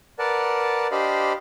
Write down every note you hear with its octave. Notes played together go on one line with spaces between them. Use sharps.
A#4 B4 D5 F#5 A5
D4 G4 C5 D#5 F5 B5